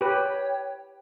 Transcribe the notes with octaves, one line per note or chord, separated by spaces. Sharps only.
G4 B4 C#5 G5